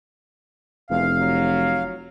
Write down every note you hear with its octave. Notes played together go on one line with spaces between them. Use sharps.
F1 E2 F5
F#3